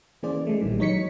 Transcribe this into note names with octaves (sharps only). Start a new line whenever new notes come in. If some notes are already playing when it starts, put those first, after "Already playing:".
E3 A#3 C#4 G#4 C5 D5
G#3 A3
B1 A#2 D#3 E3 G3 G#3
F#3 D#4 C#5 B6 C#7